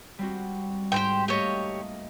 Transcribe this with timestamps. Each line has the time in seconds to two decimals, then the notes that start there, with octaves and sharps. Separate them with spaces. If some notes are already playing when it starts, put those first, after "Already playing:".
0.19 G3 C4 F#4
0.92 G#2 G4 C5 G5
1.28 A3 A#3 G4 C#5 D#5